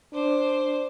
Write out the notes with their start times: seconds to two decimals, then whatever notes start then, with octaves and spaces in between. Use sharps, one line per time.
0.13 D4 C5 D6